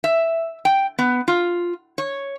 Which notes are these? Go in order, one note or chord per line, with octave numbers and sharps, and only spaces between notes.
E5
G5
B3
F4
C#5